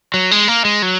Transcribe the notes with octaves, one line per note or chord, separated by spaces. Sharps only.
F#3
G#3
A#3
G#3
F#3